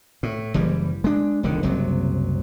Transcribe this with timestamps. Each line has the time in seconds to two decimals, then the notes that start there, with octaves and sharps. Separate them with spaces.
0.23 A2
0.54 F#1 E3 G3
1.04 G#3 D4
1.43 E1 C#2 D3 D#3
1.63 F#1 C2 C3 F#3